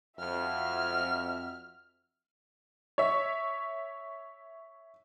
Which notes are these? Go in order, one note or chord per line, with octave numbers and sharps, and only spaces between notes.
F2 F#4 E5 F6
C#5 E5